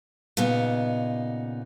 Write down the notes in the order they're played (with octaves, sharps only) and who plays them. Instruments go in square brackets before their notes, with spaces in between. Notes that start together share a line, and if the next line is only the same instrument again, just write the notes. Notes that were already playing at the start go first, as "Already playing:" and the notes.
[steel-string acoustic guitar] A#2 C#3 B3 D#4